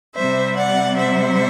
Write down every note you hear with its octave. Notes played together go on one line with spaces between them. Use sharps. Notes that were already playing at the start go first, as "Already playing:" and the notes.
C3 G3 C5 E5
D5 F#5
C5 E5